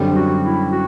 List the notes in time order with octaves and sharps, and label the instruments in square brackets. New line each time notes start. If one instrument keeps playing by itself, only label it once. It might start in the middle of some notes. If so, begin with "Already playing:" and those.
Already playing: [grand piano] F#2 D3 G3 C4
[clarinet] F#4
E4
F#4